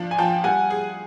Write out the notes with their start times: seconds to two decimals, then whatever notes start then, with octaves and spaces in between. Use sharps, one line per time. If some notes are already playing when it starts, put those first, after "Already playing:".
Already playing: F3 D4
0.11 G#5
0.18 F3 G5 A5
0.44 G3 F#5 G#5
0.70 G#4